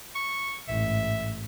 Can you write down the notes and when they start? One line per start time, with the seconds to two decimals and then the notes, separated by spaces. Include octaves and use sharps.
0.15 C#6
0.68 A1 G#2 E5